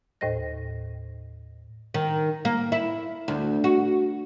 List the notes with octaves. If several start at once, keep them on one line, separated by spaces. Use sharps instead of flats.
D#2 A2 C5 D#5 A#6
D#3
A#3
E4
D2
F#4